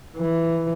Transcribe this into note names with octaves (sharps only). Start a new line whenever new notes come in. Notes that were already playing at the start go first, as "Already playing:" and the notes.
E3